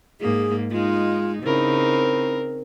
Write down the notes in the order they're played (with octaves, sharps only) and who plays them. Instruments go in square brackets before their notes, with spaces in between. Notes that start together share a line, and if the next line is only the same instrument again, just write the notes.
[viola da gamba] G#2 A#3 [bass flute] G#4
[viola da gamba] G#3 D#4 [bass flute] F4
[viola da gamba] C#3 D#4 [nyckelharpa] C4 A#4 [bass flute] E4